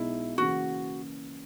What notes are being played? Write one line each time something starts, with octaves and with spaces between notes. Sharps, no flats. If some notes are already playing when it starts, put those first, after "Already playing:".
Already playing: B1 B2 G#3 D#4 E4
C#3 E3 A#3 C#4 F#4 G#4